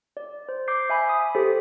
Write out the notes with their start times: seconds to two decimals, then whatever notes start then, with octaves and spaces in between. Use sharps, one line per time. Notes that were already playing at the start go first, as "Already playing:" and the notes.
0.17 D5
0.49 C5
0.68 D6 G6 C7
0.89 E5 G#5 B5
1.09 D#6
1.35 G4 A4 C5 B6